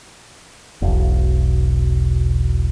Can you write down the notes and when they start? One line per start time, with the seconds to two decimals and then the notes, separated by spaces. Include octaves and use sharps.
0.82 E1 B1